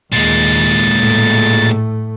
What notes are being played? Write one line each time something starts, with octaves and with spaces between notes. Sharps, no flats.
D#2 A#2 G#3 A6
A2 A3